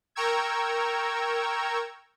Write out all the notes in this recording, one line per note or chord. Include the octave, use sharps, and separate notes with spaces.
A#4 G5 A#5 C#6 E6 G#6